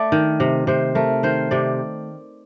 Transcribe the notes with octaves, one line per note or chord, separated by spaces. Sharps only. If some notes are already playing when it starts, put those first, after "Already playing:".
Already playing: A3 D5
D#3
C3
C3 C5
A3 A#4
D#3 C5
C3 D5